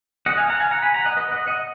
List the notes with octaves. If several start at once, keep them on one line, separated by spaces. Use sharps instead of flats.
D#5 F#5
F5 G#5
F#5 A#5
F5 G#5
F#5 A#5
G#5 B5
F#5 A#5
D#5 F#5
B4 D#5
D#5 F#5
D#5 F#5